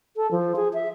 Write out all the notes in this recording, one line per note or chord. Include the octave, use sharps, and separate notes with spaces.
A4
F3
G#4
E5